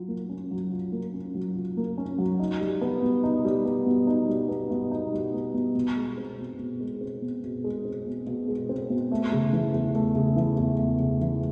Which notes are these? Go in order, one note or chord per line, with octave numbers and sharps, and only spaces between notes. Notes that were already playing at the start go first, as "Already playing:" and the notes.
Already playing: F#3 F4
A#3
C#4
F#3
F4
A#3
C#4
F#3
F4
A#3
C#4
F#3
D#4
G3
B3
B2
D#4
G3
B3
B2
D#4
G3
B3
B2
D#4
G3
B3
B2
B2
G#3
C4
B2
B2
G#3
C4
B2
B2
G#3
C4
B2
B2
G#3
C4
B2
A3
C#3
E3
E2
A3
C#3
E3
E2
A3
C#3
E3